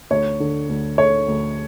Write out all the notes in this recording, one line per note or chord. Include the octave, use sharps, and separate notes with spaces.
D2 C#5
D3
D2
A3 C#5
D2